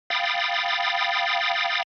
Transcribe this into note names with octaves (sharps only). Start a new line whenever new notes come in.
F5 G5 B5 D#6 A6